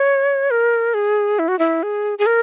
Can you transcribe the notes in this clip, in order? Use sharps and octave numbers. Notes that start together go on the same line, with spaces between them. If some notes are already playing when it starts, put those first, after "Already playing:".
Already playing: C#5
A#4
G#4
E4
F#4
E4
G#4
G#4
A#4